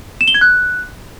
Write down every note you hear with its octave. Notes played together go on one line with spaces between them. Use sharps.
E7
G7
G#6
F#6